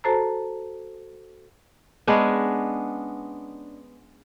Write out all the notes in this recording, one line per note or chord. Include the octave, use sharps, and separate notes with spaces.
F#4 A4 C5 A5 A#5
G#3 B3 C#4 D4